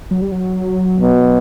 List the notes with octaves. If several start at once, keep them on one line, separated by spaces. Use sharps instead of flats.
F#3
G3
F#3
B2